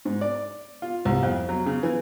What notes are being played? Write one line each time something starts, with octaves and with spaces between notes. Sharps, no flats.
G#2
D5
F4
C2
F2
F#3
C#3
E3